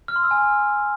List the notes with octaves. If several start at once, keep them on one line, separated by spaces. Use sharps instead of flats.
F6
C6
E6
G#5